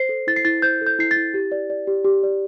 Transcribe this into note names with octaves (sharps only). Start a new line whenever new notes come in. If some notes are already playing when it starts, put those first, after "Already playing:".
Already playing: C5 C7
A4
E4 A6
C7
E4 A6
C5 G6
A4
G6
E4 C7
A6
E4
G4
D5
D5
G4
G4
D5